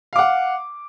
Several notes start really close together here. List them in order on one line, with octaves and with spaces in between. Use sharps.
F5 D6 F#5